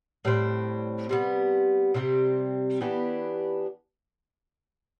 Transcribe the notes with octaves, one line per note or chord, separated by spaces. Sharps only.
A2 G3 C4
C3 G3 B3
C3 G3 C4 G4
E3 B3 D4 G4